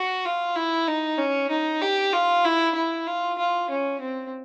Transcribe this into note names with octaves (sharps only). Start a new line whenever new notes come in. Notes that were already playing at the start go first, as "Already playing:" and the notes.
Already playing: F#4
F4
E4
D#4
C#4
D#4
G4
F4
E4
E4
F4
F4
C#4
C4